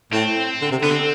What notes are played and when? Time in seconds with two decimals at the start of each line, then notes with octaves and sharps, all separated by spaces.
0.13 A2 C4
0.62 D3
0.71 C3
0.82 D3 B3
0.91 C4